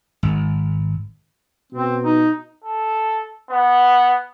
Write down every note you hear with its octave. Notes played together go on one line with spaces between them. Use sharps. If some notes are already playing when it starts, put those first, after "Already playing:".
G#1
B2 C4
D#4
A4
B3